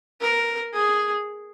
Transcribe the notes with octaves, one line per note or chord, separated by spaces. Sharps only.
A#4
G#4